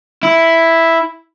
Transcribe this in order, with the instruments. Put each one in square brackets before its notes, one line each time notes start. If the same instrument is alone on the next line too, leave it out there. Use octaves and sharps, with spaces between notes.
[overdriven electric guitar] E4